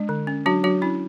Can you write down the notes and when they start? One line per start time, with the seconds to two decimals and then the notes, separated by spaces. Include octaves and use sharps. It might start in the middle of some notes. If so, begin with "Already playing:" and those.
Already playing: G#3 D4
0.09 D3
0.27 C#4
0.46 F#3 D4 F#4
0.64 F#3 D4 F#4
0.82 C#4 E4